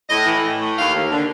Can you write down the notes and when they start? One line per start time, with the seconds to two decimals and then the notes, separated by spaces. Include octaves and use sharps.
0.08 A2 D#5
0.25 E3
0.43 A2
0.60 A3
0.77 D#2 F5
0.94 D#2
1.11 D3